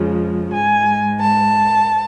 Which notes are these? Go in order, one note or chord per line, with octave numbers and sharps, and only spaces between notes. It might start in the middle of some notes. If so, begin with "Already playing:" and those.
Already playing: F2 C#3 F3 G#3
G#2 G#3 G#5
A5